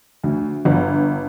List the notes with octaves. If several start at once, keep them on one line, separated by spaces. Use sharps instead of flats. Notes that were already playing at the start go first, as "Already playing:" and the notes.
D2
G1